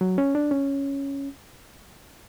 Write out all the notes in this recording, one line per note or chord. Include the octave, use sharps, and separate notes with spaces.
F#3
C#4
D4
C#4